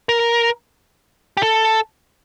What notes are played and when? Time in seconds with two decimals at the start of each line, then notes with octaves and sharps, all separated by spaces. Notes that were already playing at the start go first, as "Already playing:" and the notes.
0.09 A#4
1.37 G4
1.43 A4